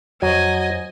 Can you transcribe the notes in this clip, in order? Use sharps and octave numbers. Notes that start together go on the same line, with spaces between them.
F2 F#3 C5 D#5 G#5